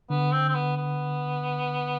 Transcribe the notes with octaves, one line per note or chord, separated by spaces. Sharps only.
D3 B3
C4
C4
B3
B3